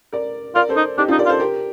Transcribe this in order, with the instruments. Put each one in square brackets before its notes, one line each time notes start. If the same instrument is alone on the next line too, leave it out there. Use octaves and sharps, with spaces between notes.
[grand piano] A#4 D5
[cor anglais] F4 [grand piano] A#4 D5
[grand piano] A4 C5
[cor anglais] D#4
[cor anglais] D4 [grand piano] D#4 G4
[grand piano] D4 F4
[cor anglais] D#4
[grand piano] A#4 D5
[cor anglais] F4
[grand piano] A4 C5
G4 A#4